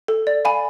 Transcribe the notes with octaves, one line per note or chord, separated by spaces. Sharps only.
A4
D5
F5 G#5 B5